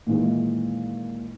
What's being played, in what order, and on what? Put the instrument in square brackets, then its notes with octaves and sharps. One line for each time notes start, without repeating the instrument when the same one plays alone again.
[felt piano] A#2 D#3 E3 G#3